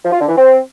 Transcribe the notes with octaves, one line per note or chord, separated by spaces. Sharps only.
F3
F4
D3
E3
C4